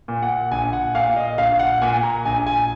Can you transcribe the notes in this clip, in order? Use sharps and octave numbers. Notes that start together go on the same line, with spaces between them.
A#2
F#5
A#1 G#5
F#5
A#2 F5
D#5
A#1 F5
F#5
A#2 G#5
A#5
A#1 G#5
G#5